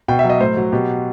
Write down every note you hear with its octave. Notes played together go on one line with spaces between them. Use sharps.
B2 G5
E5
F#3
D#5
A2 C5
F#3
B2 G4